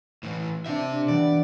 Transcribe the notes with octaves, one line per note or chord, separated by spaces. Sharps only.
A2 E3
C3 D4 G4 E5
E3 G3 B3 D5